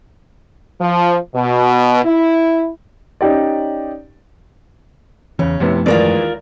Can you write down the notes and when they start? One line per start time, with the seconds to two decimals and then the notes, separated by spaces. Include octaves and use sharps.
0.81 F3
1.34 B2
2.05 E4
3.21 C#4 D#4 G4 D5
5.39 E2 C#3 E3 C#4
5.60 F#2 C3 F3 A3 B3 E4
5.86 D#2 E3 G#3 F4 A#4 D5